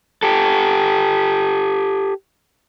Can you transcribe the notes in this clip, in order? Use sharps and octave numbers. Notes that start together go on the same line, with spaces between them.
G4 A4